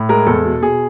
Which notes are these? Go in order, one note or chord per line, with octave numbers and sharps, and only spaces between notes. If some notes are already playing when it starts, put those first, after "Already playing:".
Already playing: A2
G#3 A#4
E2 A4
B2
B2 G#4